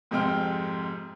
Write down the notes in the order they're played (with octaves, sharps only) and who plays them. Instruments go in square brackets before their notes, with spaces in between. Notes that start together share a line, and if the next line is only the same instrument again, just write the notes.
[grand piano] F2 G#2 C3 G5 F6